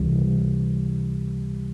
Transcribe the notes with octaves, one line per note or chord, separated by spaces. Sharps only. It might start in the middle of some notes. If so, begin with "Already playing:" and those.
Already playing: C#2 C3 E3 G3